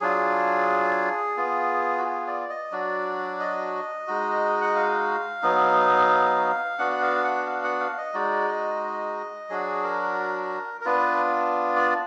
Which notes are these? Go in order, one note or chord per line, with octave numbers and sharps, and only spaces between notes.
F#3 D4 F4 G#4
B3 F4
F#4
G#4
D5
D#5
F#3 D4 F#4 D5
D#5
G#3 D#4 F#4
F#5
F5
F#3 B3 D#4
B3 D4 F#4 F#5
F5
F#5
F5
F#5
F5
D#5
G#3 D#4 F#4 D5
D#5
F#3 D4 F#4 G#4
A#4
A#4
B3 D4 F4 B4
D5